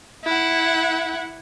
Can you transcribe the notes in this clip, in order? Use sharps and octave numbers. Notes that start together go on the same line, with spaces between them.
E4 F#5